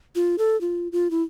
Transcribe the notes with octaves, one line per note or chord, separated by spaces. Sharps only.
F4
A4
F4
F4
E4